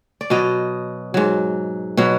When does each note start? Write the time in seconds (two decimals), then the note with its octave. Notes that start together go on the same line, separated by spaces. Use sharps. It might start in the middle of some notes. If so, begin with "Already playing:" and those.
0.21 D5
0.30 B2 F#3 D#5
1.14 G#2 F#3
1.97 B2 F#3